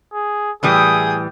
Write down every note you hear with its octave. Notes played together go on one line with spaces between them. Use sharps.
G#4
A2 E3 G3 G#4 G5 D#6